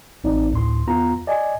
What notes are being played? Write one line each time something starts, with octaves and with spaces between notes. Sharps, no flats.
A1 C4 D#4 D5
D2 A2 C6
E2 B3 F4 A#5
D5 D#5 G#5